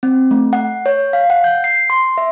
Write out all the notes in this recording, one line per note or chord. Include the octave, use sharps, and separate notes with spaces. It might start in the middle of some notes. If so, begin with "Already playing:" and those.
C4
A3
F#5
C#5
F5
F#5
G6
C7
C6
E5